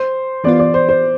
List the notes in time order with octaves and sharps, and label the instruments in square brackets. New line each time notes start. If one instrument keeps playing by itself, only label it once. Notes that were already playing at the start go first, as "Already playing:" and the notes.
Already playing: [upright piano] C5
[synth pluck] E3 B3 F4 [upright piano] D5
[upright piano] D5
C5
C5